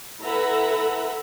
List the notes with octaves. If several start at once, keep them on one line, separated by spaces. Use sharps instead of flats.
E4 A4 B4 E5 F#5 A#5